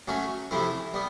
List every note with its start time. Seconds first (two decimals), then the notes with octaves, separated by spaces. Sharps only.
0.08 F#3 A3 C#4 F#4
0.51 C3 F3 A3 C4 E4
0.94 G3 B3